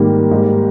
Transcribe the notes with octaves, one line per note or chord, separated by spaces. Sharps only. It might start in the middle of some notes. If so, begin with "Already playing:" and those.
Already playing: G#2 D#3 G3 A#3
G#2 G3